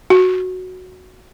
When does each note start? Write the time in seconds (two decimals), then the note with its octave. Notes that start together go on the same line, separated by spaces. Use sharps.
0.10 F#4